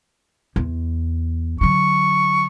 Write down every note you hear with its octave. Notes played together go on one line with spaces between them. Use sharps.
E2
D3 F#3 C#6